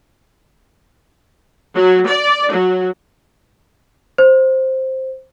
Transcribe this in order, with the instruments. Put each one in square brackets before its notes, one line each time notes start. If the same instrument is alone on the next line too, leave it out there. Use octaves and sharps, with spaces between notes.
[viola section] F#3
D5
F#3
[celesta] C5